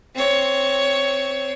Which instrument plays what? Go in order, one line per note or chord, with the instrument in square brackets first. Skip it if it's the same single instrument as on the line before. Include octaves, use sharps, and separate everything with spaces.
[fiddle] C4 C#5